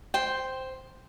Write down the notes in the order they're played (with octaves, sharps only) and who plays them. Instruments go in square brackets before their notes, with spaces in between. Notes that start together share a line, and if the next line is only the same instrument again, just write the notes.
[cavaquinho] C5 G5